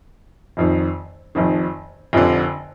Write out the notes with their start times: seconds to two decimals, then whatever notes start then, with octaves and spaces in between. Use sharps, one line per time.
0.57 F1 F2 D#3
1.35 F1 F2 D#3
2.13 F1 F2 D3